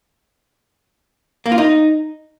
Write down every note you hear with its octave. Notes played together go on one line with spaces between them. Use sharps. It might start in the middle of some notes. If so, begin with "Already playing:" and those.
A#3
F4
D#4